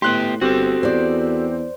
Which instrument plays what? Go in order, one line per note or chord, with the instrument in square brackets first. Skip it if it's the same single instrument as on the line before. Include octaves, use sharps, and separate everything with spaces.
[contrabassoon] A2 [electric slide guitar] B3 G4 [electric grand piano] C6 F#6
[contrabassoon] G1 [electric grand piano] C4 G4 [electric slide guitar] F#4 A4
[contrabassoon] E2 [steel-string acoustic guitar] C5 D5